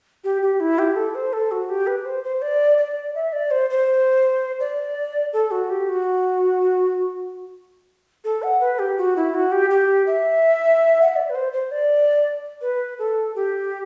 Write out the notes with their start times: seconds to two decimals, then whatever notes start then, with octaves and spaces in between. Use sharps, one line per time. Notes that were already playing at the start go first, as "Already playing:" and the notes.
0.24 G4
0.42 G4
0.60 E4
0.79 G4
0.96 A4
1.15 C5
1.33 A4
1.52 F#4
1.69 G4
1.87 B4
2.05 C5
2.24 C5
2.42 D5
2.78 D5
3.15 E5
3.33 D5
3.51 C5
3.70 C5
4.60 D5
5.33 A4
5.51 F#4
5.70 G4
5.89 F#4
8.24 A4
8.43 F#5
8.61 B4
8.79 G4
8.98 F#4
9.17 E4
9.34 F#4
9.52 G4
9.70 G4
10.07 E5
11.02 F#5
11.09 E5
11.16 D5
11.30 B4
11.35 C5
11.53 C5
11.71 D5
12.61 B4
12.99 A4
13.35 G4